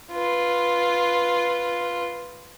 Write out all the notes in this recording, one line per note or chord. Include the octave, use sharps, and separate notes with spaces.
F4 B4